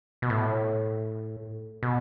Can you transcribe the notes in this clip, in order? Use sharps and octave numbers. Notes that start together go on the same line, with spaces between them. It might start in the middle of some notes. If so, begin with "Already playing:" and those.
B2
A2
B2